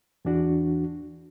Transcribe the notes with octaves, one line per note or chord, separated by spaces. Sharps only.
E2 E3 D4 F#4